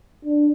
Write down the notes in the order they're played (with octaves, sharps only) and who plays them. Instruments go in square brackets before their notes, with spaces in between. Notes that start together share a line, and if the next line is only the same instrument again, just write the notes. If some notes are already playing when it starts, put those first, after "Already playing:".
[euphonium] D4